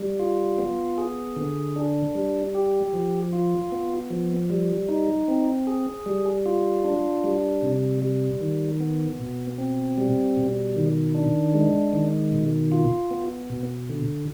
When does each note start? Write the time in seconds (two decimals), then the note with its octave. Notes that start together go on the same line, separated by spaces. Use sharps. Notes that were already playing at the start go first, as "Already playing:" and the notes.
Already playing: G3
0.20 F4
0.58 B3
0.98 G#4
1.36 D3
1.76 D4
2.15 G3
2.55 G4
2.93 F3
3.33 F4
3.72 B3
4.10 F3
4.50 G3
4.89 D#4
5.28 C4
5.67 G#4
6.06 G3
6.46 F4
6.84 D4
7.24 G3
7.62 C3
8.02 G3
8.41 D#3
8.80 B3
9.20 B2
9.58 C4
9.98 G3
10.37 B2
10.76 D#3
11.15 D4
11.54 G#3
11.93 D#3
12.32 B2
12.72 F4
13.11 B3
13.50 B2
13.89 D3